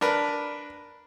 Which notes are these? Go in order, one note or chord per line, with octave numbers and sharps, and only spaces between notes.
D4 A#4 B4